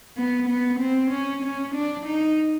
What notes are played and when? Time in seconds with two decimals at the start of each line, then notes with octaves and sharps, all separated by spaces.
0.17 B3
0.48 B3
0.80 C4
1.11 C#4
1.43 C#4
1.75 D4
2.06 D#4